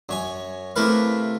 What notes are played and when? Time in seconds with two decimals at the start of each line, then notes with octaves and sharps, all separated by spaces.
0.09 F#2 C#5 G#5
0.76 C3 A3 E4 A#4 B4 F5